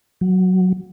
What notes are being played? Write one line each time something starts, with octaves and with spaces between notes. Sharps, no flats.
F#3